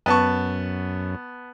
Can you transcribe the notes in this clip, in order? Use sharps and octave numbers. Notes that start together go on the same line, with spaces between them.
F#2 B3 A5 C#6